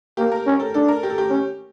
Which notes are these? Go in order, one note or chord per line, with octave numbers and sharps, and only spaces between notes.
A#3 G4
A#4
C#4
A4
D4 A4
A#4
G4
A4
G4
C#4